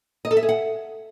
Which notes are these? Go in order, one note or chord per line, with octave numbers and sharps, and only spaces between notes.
D#5
A4
E5
G#4
F#5